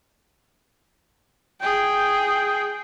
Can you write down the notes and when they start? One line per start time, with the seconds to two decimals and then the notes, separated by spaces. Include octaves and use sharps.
1.61 G#4 G5